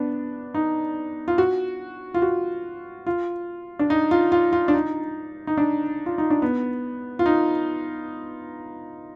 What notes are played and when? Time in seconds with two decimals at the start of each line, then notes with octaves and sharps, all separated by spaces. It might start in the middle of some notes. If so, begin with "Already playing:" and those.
Already playing: B3 D4
0.54 D#4
1.28 F4
1.38 F#4
2.14 F4
2.22 F#4
3.07 F4
3.79 D4
3.90 D#4
4.11 F4
4.32 F4
4.53 F4
4.68 D4
4.74 D#4
5.47 D#4
5.57 D4
6.06 F4
6.18 D#4
6.30 D4
6.42 B3
7.19 F4
7.26 D#4